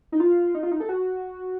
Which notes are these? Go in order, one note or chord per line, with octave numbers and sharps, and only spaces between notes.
D#4
F4
D#4
F4
D#4
A4
F#4